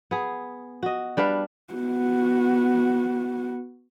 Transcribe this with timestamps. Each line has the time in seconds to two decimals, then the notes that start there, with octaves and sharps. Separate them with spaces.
0.11 B3 G#4
0.83 F#4 D#5
1.17 G3 D4 B4 F5
1.73 B3 F#4